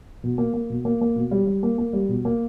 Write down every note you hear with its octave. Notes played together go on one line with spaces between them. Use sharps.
B2
A#3
A#3
B2
A#3
A#3
B2
G3
G3
A#3
A#3
G3
B2
A#3